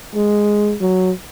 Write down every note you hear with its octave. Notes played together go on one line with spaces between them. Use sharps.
G#3
F#3